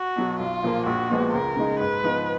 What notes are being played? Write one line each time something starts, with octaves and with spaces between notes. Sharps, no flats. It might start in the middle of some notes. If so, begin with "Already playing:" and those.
Already playing: F#4
B2 F#3
B1 F4
A#2 F3 A#3
A#1 F#4
A#2 F3 G#3 B3
C#2 A#4
C#3 G#3 D#4
G#2 B4
F3 B3 D#4